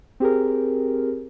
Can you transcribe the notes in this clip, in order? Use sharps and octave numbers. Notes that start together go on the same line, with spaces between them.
C4 G4 G#4 A#4